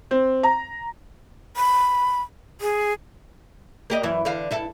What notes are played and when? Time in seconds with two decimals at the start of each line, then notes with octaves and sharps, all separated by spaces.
0.11 C4
0.43 A#5
1.57 B5
2.61 G#4
3.90 A#3 G4 D#5
4.03 F#2 E3 E4
4.25 D3 E3 F5
4.51 G2 E4 A4